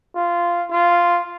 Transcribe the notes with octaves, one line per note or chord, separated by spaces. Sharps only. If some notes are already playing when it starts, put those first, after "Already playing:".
F4
F4